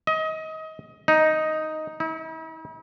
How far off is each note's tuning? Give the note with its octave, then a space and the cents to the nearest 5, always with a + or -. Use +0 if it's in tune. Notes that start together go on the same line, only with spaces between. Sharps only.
D#5 +25
D#4 +5
E4 -45